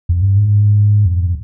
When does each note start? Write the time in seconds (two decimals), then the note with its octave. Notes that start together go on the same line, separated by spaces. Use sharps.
0.09 F2
0.22 G2
0.36 G#2
1.05 F2